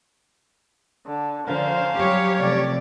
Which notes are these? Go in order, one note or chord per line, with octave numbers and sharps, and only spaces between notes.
D3
D3 F3 C#4 A#4 C5 F5
F#3 G3 G4 C#5
C3 F3 A3 D5